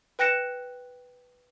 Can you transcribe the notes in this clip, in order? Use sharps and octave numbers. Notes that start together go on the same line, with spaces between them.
B4 G5 F#6 A#6 C#7 E7